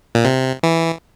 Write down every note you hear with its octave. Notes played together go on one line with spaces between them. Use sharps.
A#2
C3
E3